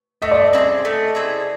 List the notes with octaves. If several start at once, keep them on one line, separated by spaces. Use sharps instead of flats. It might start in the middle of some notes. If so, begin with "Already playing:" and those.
A3 D#5
D5
D#5
C4 E4 G#4
A3
C4 E4 G#4